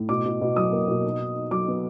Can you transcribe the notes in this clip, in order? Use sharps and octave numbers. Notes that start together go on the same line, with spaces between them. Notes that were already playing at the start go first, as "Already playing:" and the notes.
Already playing: A2
B2 D6
B2
B2
F#3 D#6
A#3
B2
D#4
D#4
D#4
F#3 D6
B3